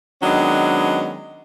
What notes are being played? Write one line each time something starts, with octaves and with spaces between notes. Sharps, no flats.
D#3 F#3 G#3 B3 C#4 D4